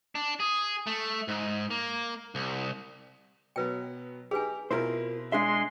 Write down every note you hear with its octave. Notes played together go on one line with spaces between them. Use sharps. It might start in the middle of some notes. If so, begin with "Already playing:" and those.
D4
G#4
A3
G#2
A#3
C2
B2 F#3 B3 B4 G5
D#4 G4 G#4 B4 G#5
B2 C4 E4 F4 A#4 C5
G#3 D4 G#4 E5 C6